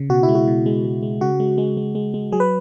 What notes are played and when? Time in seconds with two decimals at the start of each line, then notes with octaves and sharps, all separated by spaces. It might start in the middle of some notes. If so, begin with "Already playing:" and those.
Already playing: C#3
0.09 B2 F#4
0.23 E4
0.29 G#3
0.35 F#4
0.47 B2
0.66 G#3
0.84 G#3
1.03 G#3
1.21 C#3 F#4
1.40 G#3
1.58 G#3
1.77 G#3
1.95 G#3
2.14 G#3
2.32 F#3 G#4
2.40 B4